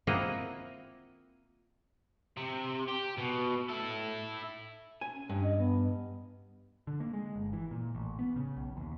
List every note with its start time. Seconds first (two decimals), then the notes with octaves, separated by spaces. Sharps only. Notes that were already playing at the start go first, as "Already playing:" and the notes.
0.07 A#3 C4 E4 F4 D#5 F#5
2.37 C3
2.88 G4
3.18 B2
3.69 E4 A4
5.01 G#5
5.14 C#4
5.29 G2
5.43 D#5
5.58 B3
6.87 D3
7.00 A#3
7.13 G#3
7.36 G1
7.53 E3
7.71 A#2
7.95 A1
8.19 B3
8.36 C#3
8.57 B1
8.77 D#2